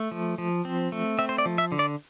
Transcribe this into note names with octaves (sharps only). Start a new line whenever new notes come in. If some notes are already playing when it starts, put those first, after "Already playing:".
Already playing: A3
F3
F3
C4
A3
C4 E5
C5
D5
F3
E5
D3
D5